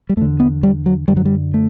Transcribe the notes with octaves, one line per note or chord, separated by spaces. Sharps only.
G3
E2 D3 A3
B3
G3
F#3
F#2 D3 G3
F#3
G3
A3